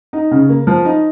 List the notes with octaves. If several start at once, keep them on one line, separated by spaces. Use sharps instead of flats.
D#4
C#3
A#3
F3
D#4